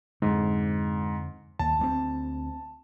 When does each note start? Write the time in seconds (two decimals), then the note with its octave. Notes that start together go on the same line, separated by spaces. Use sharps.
0.22 F2 G#2 D3
1.59 D#2 A5
1.79 D2 A3 C4